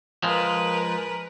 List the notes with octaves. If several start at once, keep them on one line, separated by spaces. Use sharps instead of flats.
F3 G#3 A#4 B4